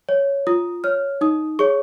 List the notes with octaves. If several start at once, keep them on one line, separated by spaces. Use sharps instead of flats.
C#5
F4 D#6
C#5 F6
D#4 D#6
G#4 C#5 C#6